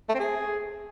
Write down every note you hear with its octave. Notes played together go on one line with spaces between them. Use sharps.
A3
C4
G#4